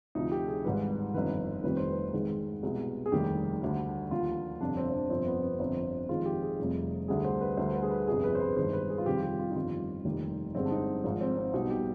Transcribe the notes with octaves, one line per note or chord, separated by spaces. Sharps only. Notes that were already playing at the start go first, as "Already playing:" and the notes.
D2 C3 F3 D#4
G4
G#4
G#1 G#2 D#3 G3 B4
G1 F2 D#3 B4
F1 F2 C3 D#3 G3 B4
C5
B4
G#1 G#2 D#3 G#3
C2 B2 G#3
G#4
F1 D#2 D#3 G3 G4
D2 D3 G3
D#2 D3 F3 F4
G1 F2 C3 D4
C4
C4
D4
G1 F2 C3 F3 C4
B3
B3
G1 F2 D3 C4
F2 D#3 G#3 F4
G4
G#4
F1 F2 C3 G3
D2 D3 G3 G#4
C5
B4
D2 D3 G3 C5
B4
G#4
B4
G1 F2 C3 G#4
B4
C5
B4
G1 G2 D#3 G#3 C5
B4
G#4
F4
F2 C3 D#3 G3 G4
F4
G4
F4
D#4
G1 F2 D#3 G3 F4
F1 D#2 D#3 G3
G1 G2 D3 G#3 C4
D4
D#4
G#1 G#2 F3 D#4
C4
C4
B1 B2 G3 D#4
G4